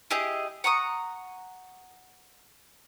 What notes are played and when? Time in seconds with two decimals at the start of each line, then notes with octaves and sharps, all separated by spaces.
0.11 E4 G4 G#4 D#5
0.64 F#5 A#5 C#6 D#6